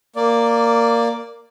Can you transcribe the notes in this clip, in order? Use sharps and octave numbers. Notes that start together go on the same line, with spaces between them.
A#3 D5